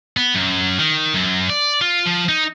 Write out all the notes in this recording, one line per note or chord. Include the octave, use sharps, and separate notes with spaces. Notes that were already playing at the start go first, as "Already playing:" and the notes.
B3
F#2
D#3
F#2
D5
F4
F3
D#4